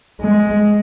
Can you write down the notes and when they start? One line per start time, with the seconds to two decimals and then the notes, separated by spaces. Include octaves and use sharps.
0.21 G#3